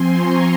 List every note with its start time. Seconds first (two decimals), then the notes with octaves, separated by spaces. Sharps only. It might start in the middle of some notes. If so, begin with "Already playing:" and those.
Already playing: F3 C4 G#5 C6
0.11 A#5 C#6